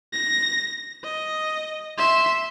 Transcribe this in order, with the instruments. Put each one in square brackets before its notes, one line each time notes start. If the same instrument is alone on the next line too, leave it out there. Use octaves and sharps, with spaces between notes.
[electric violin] A#6
D#5
E5 C6